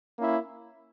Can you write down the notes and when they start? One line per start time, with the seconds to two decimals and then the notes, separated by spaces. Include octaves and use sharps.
0.16 A#3 C#4 E4